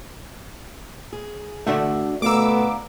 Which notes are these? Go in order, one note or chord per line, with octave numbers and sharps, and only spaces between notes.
G#4
D3 A3 D4 F#4 E5
D2 B2 A3 B3 F5 A#5 D6 E6